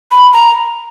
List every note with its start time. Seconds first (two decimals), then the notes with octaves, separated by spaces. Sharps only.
0.11 B5
0.33 A#5